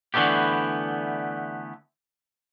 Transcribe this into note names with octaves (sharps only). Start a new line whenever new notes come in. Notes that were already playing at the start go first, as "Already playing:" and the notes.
D3 E3 A3 B3 G4